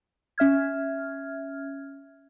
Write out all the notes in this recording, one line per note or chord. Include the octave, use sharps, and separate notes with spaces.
C#4 E5 F6 G#6